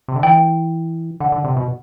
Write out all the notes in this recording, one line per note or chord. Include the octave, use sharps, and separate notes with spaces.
C3
D3
E3 G5
D3 F#5
D3
C3
B2